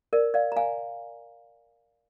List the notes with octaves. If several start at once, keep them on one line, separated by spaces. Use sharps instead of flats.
A#4 D5
D5 F5
A#5
F5 G#5